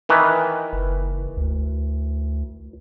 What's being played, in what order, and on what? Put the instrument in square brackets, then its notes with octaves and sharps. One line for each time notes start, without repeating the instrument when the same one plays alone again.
[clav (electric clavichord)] D#3 E3 B4
[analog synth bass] F#1
D2